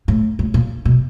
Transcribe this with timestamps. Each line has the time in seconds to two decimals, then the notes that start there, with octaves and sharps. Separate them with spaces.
0.08 A2
0.39 A2
0.54 A#2
0.85 B2